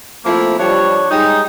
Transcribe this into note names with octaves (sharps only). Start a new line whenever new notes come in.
F3 A3 A#3 C4 E4
F3 G3 D4 C#5
G3 G#3 D#4